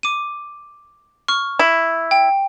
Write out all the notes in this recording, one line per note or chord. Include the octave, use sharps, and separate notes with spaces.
D6 D#7
C#6 F6
E4
G5